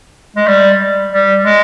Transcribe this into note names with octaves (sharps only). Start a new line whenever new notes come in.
G#3
G3
G3
G#3